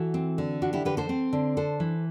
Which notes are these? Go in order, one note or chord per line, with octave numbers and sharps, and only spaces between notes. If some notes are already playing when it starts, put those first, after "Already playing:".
Already playing: E3 F#4 A4
C4
D3
D4 F#4
E4 G4
D3 G4 B4
A4 C5
C4
D3
D4 A4 C5
E3